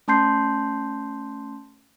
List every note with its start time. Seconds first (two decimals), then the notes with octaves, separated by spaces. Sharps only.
0.08 A3 C#4 A5 C6 G6 C7